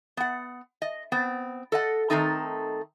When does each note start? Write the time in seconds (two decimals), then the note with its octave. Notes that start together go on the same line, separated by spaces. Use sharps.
0.17 B3 F#5
0.82 D#5
1.12 B3 C4
1.72 A4 D#5 F#5
2.10 D#3 F#3 A3 C4 D#4 A4